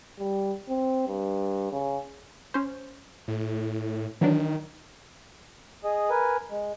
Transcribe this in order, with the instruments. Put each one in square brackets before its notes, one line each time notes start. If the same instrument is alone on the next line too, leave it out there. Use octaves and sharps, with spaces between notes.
[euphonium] G3
C4
G2
C#3
[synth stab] C#4 C5
[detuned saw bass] A2
[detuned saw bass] D#3 [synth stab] E3 F#3 D4
[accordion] G#4 D#5
A#4 B4 G#5
G#3